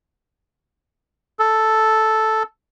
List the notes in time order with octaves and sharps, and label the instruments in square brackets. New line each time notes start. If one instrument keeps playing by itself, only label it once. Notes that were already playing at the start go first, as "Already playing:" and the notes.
[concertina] A4